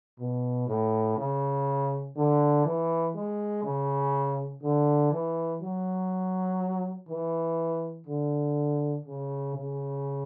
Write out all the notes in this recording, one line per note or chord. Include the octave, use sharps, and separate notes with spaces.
B2
A2
C#3
D3
E3
G#3
C#3
D3
E3
F#3
E3
D3
C#3
C#3